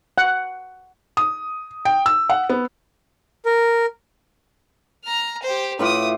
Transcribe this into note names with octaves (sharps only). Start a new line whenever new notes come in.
F#5
D#6
G5
E6
F#5
B3
A#4
A#5 F6
G4 C5
A2 F4 B4 D6 D#6